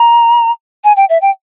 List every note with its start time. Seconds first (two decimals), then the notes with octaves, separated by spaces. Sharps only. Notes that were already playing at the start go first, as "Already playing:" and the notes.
Already playing: A#5
0.84 G#5
0.96 G5
1.09 E5
1.22 G5